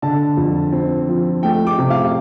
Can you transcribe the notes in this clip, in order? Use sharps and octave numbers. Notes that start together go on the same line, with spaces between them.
D3 A5
F2
C4
F3
A3 G5
D6
C3
F5